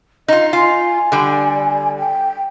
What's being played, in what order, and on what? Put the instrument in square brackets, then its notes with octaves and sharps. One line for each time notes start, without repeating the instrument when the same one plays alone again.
[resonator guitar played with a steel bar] D#4 F4 [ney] D#5
[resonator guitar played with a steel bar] F4 [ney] G#5
[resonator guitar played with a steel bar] D3 G3
[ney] G5